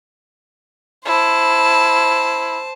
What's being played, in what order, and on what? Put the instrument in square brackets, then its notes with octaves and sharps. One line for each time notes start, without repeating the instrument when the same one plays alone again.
[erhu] E4 [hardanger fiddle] C5 A5